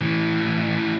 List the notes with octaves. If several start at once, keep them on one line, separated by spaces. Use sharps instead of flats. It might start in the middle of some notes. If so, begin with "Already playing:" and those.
A2 E3